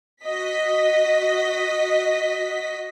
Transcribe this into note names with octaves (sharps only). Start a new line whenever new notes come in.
F#4 D#5 B6